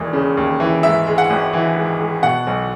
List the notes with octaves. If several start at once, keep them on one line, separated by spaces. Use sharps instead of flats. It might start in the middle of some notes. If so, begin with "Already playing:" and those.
Already playing: E1 D#2 E3
C#3
D#2
E3
G#2 E5
G#3
F#5
G#1
E3
G#2
G#3
B2 F#5
B1